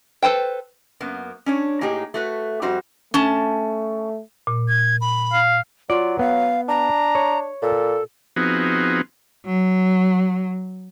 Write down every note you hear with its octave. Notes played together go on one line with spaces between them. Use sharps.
A4 B4 C5 G5
F#2 A#3 B3
C#4 D4 C#5
A2 A#3 D#4 G4 G#4
A3 F#4 B4
F2 G3 F#4 C5
A3 C#4 A5
A#2
G#6
B5
F5
F#3 F4 D5
B3 F5
D4 A#5
C#5
A#2 A4
F3 B3 C4 D#4 F#4 G#4
F#3